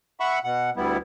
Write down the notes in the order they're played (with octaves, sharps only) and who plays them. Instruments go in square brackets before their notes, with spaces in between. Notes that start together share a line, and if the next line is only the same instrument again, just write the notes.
[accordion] E5 F#5 B5 C#6
B2 F#5
D2 G3 B3 E4